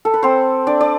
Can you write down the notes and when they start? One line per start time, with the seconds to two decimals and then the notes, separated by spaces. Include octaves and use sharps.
0.05 A4
0.14 B4
0.23 C4 C5
0.67 D4 D5
0.81 D5